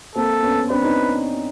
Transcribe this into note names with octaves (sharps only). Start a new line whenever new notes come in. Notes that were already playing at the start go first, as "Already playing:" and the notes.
A#3 C4 A4
B3 C#4
C4 D4 B4
C#4 D#4